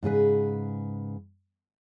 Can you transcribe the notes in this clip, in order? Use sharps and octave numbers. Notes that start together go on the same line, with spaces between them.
G#2 C#3 G#4 B4